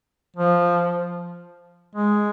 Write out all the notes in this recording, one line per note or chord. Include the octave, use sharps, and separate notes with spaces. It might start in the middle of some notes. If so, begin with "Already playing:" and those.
F3
G#3